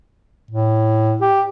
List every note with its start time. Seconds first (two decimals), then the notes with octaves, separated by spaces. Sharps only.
0.51 A2
1.21 G4